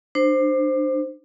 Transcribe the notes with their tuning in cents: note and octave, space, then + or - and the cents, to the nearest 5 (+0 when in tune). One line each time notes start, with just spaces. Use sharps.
D4 +25 C5 +0